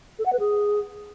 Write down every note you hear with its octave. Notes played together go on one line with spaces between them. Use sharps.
A4
F#5
B4
G#4